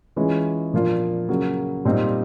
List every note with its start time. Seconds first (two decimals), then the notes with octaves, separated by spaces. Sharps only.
0.16 E3 G#3 C#4 F4
0.73 A#2 F3 A#3 D4 F4
1.29 C#3 F#3 A#3
1.85 A#2 G3 C4 D#4